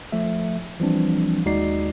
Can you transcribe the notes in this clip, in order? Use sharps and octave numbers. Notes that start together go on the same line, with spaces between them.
F3 A3 E5
E3 F3 G3 C4 D4
D#2 G#3 D#4 F#4 D5 C7